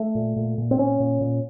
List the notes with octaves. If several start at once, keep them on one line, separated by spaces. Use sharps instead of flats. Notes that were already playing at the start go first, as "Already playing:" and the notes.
Already playing: A3
A#2
A#2
A#2
C4
A#2 C#4
A#2
A#2